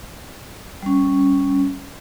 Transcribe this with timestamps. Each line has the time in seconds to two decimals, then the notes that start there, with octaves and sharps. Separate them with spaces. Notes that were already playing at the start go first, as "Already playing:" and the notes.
0.83 G3 C#4